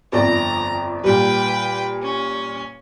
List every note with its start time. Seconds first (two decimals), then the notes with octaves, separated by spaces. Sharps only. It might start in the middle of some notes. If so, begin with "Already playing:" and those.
0.12 G1 F2 D5 A#5
1.04 A#2 G3 B4 G5
2.02 C#4